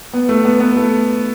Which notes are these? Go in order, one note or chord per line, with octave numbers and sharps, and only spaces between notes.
B3
A3
B3
B3
A3